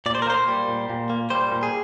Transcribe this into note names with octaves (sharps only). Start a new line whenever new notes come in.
A#2 D5
C5
A#4
A#3 C5
G3
A#2
A#2
A#3
G3 C5
A#2
G#4